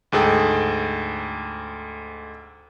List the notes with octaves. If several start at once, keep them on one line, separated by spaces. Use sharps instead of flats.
D2 G#2 G#4 A4 G5